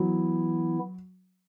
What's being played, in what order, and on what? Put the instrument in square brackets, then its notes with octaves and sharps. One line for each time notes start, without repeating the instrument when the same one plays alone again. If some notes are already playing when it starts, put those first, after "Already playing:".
Already playing: [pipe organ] E3 B3 E4 [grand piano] F#3